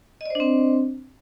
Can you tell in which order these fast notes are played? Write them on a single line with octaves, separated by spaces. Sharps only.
D#5 D5 C5 D4 C4